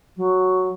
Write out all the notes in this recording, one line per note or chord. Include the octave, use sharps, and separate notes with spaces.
F#3